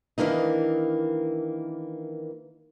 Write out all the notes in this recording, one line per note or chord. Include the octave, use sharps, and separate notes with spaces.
D#3 E3 A#3 D4 D#4